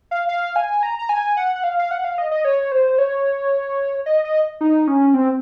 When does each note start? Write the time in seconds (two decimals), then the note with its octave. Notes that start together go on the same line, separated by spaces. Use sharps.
0.11 F5
0.29 F5
0.56 G#5
0.83 A#5
0.99 A#5
1.09 G#5
1.37 F#5
1.56 F#5
1.64 F5
1.79 F5
1.91 F#5
2.04 F5
2.18 D#5
2.31 D#5
2.45 C#5
2.72 C5
2.98 C#5
4.06 D#5
4.25 D#5
4.61 D#4
4.88 C#4
5.14 C4